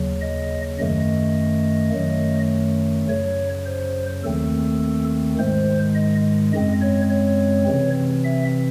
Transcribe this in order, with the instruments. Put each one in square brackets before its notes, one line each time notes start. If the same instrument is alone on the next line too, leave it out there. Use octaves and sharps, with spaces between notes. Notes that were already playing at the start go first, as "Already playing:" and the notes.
Already playing: [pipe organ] D#2 C#3 F#3
D#5
F#2 D#3 A3 D#5
F#2 D#3 F#3 A3
F#2 C#3 F#3 C#5
C5
D#2 D#3 A3 C4 A4
G#2 D#3 G#3 C5
D#5
F#2 C#3 G#3 C4 D#5
C#5
C#5
C3 E3 C4
E5